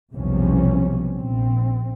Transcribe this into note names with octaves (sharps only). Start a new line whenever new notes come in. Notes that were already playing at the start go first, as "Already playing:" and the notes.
B1 E2 C3 F3 G3 C#4
A#1 C4